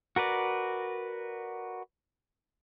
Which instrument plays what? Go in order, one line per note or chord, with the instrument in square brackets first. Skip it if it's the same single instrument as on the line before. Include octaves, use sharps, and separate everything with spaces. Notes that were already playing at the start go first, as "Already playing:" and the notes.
[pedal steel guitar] F#4 A#4 B4 D5